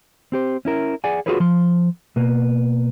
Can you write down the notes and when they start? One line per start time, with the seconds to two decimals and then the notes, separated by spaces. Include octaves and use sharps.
0.32 C4 G4 C5
0.65 C#4 E4 A#4
1.04 G#4 D5 F#5 G#5
1.26 F4 F#4 G#4 A4 B4 C#5
1.40 F3 C6
2.16 B2 A#3 B4